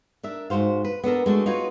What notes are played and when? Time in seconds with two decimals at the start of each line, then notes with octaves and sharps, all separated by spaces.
0.23 D4 A#4 E5
0.50 G#2 C#3 F#4 C5 F5
0.84 B4
1.04 B3 D4 A4 A#4
1.26 G#3 A3 D4 F#4
1.46 D#4 F4 F#4 B4 C#5